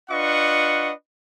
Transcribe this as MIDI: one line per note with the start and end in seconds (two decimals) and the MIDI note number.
0.10 0.91 62
0.10 0.91 65
0.10 0.91 71
0.10 0.91 75
0.10 0.91 78
0.10 0.91 85